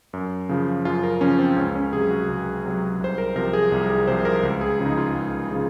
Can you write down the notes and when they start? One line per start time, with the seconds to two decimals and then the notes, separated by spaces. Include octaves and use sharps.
0.13 F#2
0.49 C#3 F3
0.85 F#2 F4
1.03 A#4
1.21 C#3 F3 C#4
1.39 C4
1.56 C#2 C#4
1.75 C#4
1.93 C3 G#4
1.97 F#3
2.11 F#4
2.28 C#2
2.65 C3 F#3
3.01 C2 C5
3.18 A#4
3.35 C3 F3 A#4
3.53 G#4
3.72 C2
3.90 G#4
4.08 C3 F3 C5
4.25 A#4
4.43 C#2
4.61 G#4
4.79 C#3 F3
4.86 D#4
4.98 F4
5.15 C#2
5.51 C#3 F3